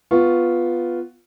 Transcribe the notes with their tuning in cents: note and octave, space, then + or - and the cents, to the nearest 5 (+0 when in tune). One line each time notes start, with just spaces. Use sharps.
B3 +0 F4 +0 C#6 +0